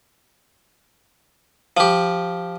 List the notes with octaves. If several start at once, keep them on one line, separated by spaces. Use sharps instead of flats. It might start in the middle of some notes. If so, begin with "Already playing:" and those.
F3 G4